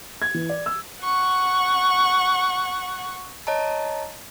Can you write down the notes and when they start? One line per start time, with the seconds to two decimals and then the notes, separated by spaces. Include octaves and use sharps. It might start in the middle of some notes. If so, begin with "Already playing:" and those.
0.22 G#6
0.34 E3
0.49 D5
0.66 E6
1.02 F#5 C#6
3.47 C#5 D#5 A5 A#5